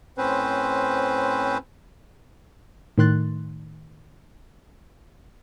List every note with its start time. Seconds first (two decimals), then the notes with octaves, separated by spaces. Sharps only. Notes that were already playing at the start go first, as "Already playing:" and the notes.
0.18 A2 C4 C#4 B4 C5
2.98 A2 D#3 C6 F#6 A6